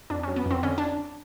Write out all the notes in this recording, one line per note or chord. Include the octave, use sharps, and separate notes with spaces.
F2 D4
C#4
F#3
B3
F2 C4
D3 C#4
D4